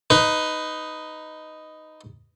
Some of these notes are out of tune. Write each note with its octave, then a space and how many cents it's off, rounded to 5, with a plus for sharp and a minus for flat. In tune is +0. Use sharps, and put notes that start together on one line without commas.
D#4 +0 B4 +15